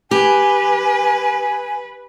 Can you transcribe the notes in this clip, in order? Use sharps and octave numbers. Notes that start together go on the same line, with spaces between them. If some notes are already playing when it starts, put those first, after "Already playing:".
G4 B4 G#5